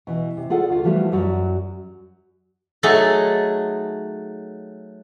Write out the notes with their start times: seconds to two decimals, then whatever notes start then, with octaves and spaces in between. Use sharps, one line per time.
0.07 B2 E3
0.37 C3
0.50 F4 G#4 A4 D5 F#5
0.69 D2 F4
0.84 E3 F3 G3 A3 F#4
1.12 F#2 F#3 D5
2.83 F#3 A3 D#4 G#4 A4